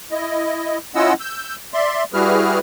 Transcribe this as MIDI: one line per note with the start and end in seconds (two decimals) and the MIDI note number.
0.12 0.78 64
0.12 0.78 75
0.95 1.13 61
0.95 1.13 64
0.95 1.13 65
0.95 1.13 75
0.95 1.13 78
0.95 1.13 88
1.20 1.56 88
1.20 1.56 91
1.74 2.04 74
1.74 2.04 76
1.74 2.04 84
2.14 2.59 55
2.14 2.59 64
2.14 2.59 66
2.14 2.59 68
2.14 2.59 71
2.14 2.59 89